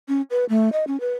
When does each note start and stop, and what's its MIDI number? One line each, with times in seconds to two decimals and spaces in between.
0.08 0.22 61
0.31 0.45 71
0.49 0.69 57
0.73 0.84 75
0.87 1.00 61
1.00 1.13 71